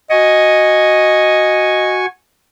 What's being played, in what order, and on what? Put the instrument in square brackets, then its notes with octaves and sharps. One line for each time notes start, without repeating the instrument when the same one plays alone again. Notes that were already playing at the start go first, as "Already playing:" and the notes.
[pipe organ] F#4 G#5 C#6 [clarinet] D#5